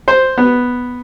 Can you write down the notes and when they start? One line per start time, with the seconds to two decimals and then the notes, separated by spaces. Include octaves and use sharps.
0.08 C5
0.38 B3